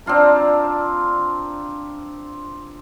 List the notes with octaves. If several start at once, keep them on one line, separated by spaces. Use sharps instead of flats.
C4 D4 F4 A#5